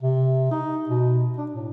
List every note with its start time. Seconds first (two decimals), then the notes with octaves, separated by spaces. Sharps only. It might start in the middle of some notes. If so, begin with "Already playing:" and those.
0.02 C3
0.51 D#4
0.89 B2
1.38 D4
1.51 A2